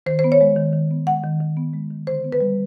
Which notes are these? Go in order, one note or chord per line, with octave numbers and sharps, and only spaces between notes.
D#3 C5
C5
B3
C#5
G#3
D#3
D#3
B3
G#3 F#5
D#3
D#3
B3
G#3
D#3
D3 C5
B3
B4
G3